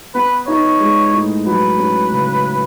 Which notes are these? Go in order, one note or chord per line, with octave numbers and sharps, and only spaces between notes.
B3 B4
D#4 C#5
G#3
A2
F#3 B4
C#4
C#3